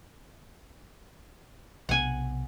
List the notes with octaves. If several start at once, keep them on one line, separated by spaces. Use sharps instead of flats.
B1 C3 B3 F#5 G#5